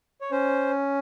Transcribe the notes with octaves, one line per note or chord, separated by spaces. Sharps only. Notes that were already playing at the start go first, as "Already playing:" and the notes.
C#5
C#4 C5